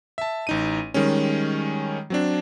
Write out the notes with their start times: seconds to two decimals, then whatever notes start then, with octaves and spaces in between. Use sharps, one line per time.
0.18 E5 A5
0.47 A1 D#4 D#7
0.94 D#3 G3 G#3 C#4
2.10 F#3 C4 D4